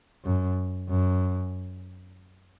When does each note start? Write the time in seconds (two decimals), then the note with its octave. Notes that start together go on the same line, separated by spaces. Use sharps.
0.25 F#2
0.89 F#2